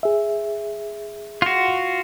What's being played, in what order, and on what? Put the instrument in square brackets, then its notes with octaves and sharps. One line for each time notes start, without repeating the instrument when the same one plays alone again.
[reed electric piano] G#4 E5
[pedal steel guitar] F4 F#4